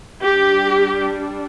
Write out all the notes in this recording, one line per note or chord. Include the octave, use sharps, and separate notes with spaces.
G3 D4 G4